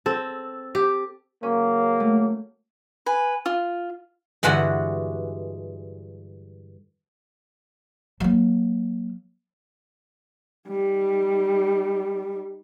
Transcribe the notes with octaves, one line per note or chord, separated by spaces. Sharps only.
C4 A4
G4
C#3 F#3 A#3 C#4
A3
B4 G#5
F4
G2 D3 E3 G#3 F#4 F#5
F#3 A#3
G3 D#4